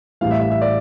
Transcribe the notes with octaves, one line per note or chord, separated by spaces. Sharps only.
A1 A2 E3 G3 F5
E5
E5
E5
D5